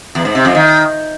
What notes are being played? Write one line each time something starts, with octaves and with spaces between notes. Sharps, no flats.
E2
G#2
C3
F2
D#3